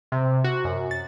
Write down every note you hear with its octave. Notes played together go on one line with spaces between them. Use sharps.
C3
F#4
F#2
A6